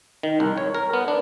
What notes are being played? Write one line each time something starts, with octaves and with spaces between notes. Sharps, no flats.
D#3
C2
C#5
A#4
B3
D4